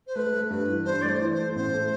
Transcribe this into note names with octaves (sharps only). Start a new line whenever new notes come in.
C5
A3 B4
A3
G2 B4
E3
G2 C5
A3 D5
C5
E3
C5
A3
A1 C5
A3